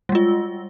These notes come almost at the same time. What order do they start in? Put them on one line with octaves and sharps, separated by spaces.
G3 G#3 F4